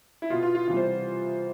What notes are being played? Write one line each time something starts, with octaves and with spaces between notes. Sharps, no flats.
E4
B2 B3 F4
F4
F4
C3 E3 G3 B3 F4
C5